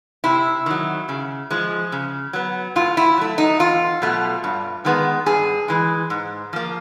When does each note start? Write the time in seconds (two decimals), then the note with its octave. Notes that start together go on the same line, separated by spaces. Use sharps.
0.24 C3 E4
0.66 D#3 F#3
1.09 C#3
1.51 F3 G#3
1.92 C#3
2.33 F#3 B3
2.76 A2 F4
2.97 E4
3.17 F#3 A3
3.38 D#4
3.59 E2 F4
4.02 B2 F#3 A3
4.44 G2
4.85 D#3 G#3 B3
5.26 G2 G#4
5.68 E3 G#3
6.10 G#2
6.53 F3 A#3